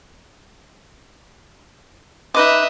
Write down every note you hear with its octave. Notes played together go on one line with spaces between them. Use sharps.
D#4 B4 D#5 E5 D6